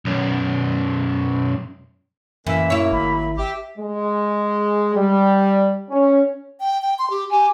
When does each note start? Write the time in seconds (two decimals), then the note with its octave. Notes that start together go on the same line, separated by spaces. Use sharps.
0.05 B1 F#2
2.47 F#2 E3 F#3 G#3 A#3 E5
2.70 E4 C#5
2.92 G#1 B5
3.38 G4 E5
3.78 G#3
4.96 G3
5.90 C#4
6.60 G5
6.82 G5
6.99 C6
7.10 G4
7.31 G4 G#5